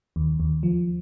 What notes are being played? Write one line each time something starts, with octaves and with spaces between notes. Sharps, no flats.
D#2
D#2
F3